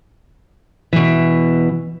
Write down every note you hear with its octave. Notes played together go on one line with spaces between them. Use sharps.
B2 E3